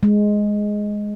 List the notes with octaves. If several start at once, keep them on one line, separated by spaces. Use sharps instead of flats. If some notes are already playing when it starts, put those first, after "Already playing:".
G#3